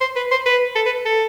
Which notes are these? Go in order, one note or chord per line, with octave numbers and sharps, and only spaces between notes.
C5
B4
C5
B4
A4
B4
A4